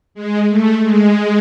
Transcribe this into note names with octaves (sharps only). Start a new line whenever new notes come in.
G#3
A3
G#3